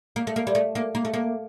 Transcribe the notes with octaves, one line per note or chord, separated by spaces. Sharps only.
A#3
A3
A#3
G3
A3
A#3
A#3
A3
A#3